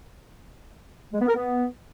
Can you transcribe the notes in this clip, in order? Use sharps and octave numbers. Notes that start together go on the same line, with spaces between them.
G#3
B3
A#4
B3